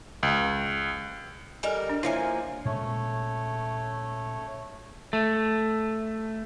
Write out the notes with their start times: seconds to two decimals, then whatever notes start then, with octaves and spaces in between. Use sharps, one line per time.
0.23 C#2
1.63 G3 D#4 A4 A#4 G#5
1.89 D4
2.03 F3 A#3 E4 C#5 E5 G#5
2.65 A#2 G#3 A3 C#4 C#5
5.13 A3